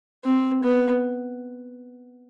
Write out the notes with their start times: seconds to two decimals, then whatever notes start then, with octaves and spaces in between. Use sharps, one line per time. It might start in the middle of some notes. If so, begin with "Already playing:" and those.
0.25 C4
0.63 B3